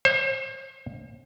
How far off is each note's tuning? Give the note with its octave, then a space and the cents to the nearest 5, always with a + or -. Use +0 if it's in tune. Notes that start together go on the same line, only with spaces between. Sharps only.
C5 +40